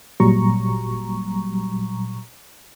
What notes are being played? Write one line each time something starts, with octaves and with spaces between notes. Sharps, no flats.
G1 A#2 F#3 G3 A#5 C#6